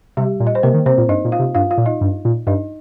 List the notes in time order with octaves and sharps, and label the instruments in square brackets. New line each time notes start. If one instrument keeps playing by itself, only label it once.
[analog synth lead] C3 [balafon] G3 G4
[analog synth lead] A#2
[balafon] D#5
C5
[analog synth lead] C3 [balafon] A#3 A#4
[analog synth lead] D#3
[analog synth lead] C3 [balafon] C4 C5
[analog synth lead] A#2
[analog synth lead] G2 [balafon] D#4 D#5
[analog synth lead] A#2
[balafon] F4 F5
[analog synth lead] C3
[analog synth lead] G2 [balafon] F4 F5
[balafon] F4 F5
[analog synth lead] A#2
[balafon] D#4 D#5
[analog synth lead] G2
A#2
[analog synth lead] G2 [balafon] D#4 D#5